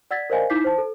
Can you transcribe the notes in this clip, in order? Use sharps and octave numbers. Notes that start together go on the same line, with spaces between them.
D5 F#5 E6 G#6 A6 B6
A#4 C5 D5 D#5 F5 G#5
D#4 E4 D6 G6 B6 C7
C5 A5
A4